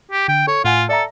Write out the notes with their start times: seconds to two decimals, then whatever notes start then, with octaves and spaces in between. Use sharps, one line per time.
0.11 G4
0.28 D3 G5
0.47 A4 C#5
0.65 A2 F4 F#5 G#5
0.89 A4 D5 E5 A#5